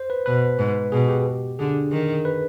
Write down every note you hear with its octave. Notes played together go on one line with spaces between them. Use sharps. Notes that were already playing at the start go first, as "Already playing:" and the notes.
Already playing: C5
B4
B2 B4
G#2
B2 G#4
G4
D3 G#4
D#3
B4